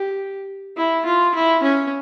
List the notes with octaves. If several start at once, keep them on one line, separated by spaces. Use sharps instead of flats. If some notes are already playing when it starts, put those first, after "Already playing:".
Already playing: G4
E4
F4
E4
C#4